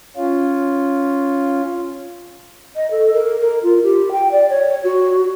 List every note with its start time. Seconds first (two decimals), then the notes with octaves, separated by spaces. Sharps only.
0.17 C#4 F4
2.76 D#5
2.91 A4
3.13 A#4
3.40 A#4
3.63 F4
3.83 G4
4.11 G5
4.31 D5
4.50 C#5
4.84 F#4